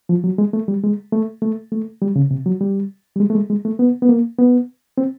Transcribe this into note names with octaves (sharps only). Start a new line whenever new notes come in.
F3
F#3
G#3
A3
G3
G#3
A3
A3
A3
G3
C#3
C3
F#3
G3
G3
G#3
A3
G#3
G#3
A3
B3
B3
A#3
B3
C4